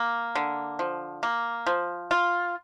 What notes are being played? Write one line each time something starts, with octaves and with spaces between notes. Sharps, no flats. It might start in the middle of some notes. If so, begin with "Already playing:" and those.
Already playing: A#3
D3
F3
A#3
F3
F4